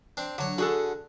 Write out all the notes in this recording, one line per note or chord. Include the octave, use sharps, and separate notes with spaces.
C4 D4
D3 F#3 C#5
D3 F#4 G#4 A4